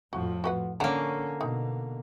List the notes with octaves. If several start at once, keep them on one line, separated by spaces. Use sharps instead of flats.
F2 A2 F3 F#4
F#4 B4 F#5
D3 A#3 C#4 F#5 A#5
B2 D#4